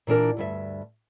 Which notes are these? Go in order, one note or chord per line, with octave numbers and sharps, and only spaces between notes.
A#2 E3 D4 A#4
D2 G2 E5